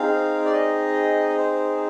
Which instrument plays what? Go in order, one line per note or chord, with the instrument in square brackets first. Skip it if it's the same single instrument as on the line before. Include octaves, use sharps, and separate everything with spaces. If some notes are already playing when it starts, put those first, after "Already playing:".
Already playing: [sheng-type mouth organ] C4 D#4 G#4 F5
D5
D#5
C5